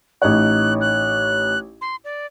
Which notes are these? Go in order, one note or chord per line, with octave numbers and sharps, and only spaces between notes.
A1 D#4 C#5 F#6
F#6
C6
D5